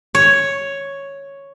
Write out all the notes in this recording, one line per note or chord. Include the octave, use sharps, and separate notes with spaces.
C#5